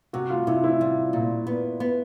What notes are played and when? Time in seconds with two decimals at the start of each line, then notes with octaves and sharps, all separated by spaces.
0.13 C3 F#4
0.30 F4
0.47 C3 E4
0.64 E4
0.80 G3 F4
1.13 A#2
1.47 B3
1.80 B3